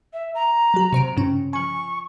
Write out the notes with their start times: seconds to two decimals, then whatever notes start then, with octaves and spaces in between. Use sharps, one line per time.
0.13 E5
0.35 A#5
0.74 F#3 F#4
0.93 C3 C5 D7
1.17 G2 C#3 C#4
1.53 F3 G#5 C#6